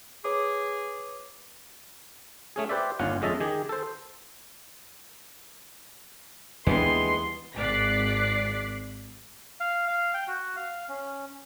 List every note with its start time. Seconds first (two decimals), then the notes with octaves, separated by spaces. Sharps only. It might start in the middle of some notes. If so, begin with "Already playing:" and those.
0.24 G#4 B4 C#5 D6
2.56 A3 C#4 G#4
2.69 G4 B4 C5 D5 E5
2.99 G1 D#2 C#4 F4 F#5
3.22 F2 G#3 C#4 D#5 E5 A5
3.41 D#3 G4 G#4
3.69 A4 C5
6.67 D#2 E3 G3 G#3 B3 D4 C6
7.56 G#1 D5 D6 F#6 B6 C7
9.60 F5
9.88 F5
10.14 G5
10.28 F#4
10.56 F5
10.89 C#4